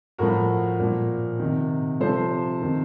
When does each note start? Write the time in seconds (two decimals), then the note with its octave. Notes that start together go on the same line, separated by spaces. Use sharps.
0.18 A2 F3 F#4 A#4
0.79 A#2 F3
1.40 C3 D#3
2.00 C3 F3 A4 C5
2.62 C3 D#3